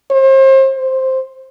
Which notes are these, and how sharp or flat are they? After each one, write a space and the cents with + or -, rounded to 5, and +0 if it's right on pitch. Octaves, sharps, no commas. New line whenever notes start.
C5 +35
C5 +5